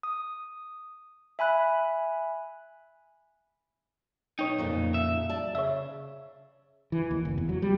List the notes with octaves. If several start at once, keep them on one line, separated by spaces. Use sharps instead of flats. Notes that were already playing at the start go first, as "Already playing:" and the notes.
D#6
E5 G#5 B5 F#6
B1 D#4 C#5 G5
F2 A#2 C#3
E5
D5 A5
C#3 C#5 E5
E3
D#2
F#1
E2
F#3
G3